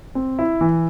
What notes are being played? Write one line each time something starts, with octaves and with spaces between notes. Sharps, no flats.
C4
E4
E3